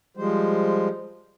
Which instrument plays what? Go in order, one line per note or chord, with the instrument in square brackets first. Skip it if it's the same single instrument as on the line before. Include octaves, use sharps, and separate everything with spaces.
[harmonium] F3 G3 G#3 C5